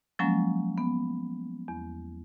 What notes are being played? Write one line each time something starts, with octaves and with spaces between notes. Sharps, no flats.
F3 F#3 G#3 A#3 C#4
B3
E2